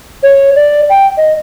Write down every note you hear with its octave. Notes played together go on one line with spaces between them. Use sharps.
C#5
D5
G5
D#5